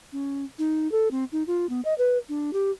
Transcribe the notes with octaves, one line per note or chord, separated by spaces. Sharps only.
C#4
D#4
A4
C4
D#4
F4
B3
D#5
B4
D4
G4